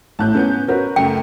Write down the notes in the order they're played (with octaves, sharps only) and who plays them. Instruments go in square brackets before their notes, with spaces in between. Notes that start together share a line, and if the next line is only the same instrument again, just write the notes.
[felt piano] A1 A2 [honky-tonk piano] A5 F#6 G6
[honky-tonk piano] A#3 B3 G6 [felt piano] C#4
[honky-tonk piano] F#4 [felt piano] A#4 B4 C#5
[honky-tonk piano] F#2 C#3 A3 [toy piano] G5